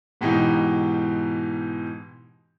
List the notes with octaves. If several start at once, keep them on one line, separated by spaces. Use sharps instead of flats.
G#2 B2 E3 D#4 G4